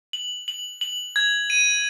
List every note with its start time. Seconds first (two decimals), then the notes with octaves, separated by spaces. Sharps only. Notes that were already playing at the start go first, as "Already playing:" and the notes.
0.13 F#7
0.48 F#7
0.81 F#7
1.16 G#6
1.50 D#7